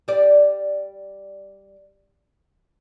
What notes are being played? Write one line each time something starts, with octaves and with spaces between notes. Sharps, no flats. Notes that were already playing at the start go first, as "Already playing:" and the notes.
G3 D5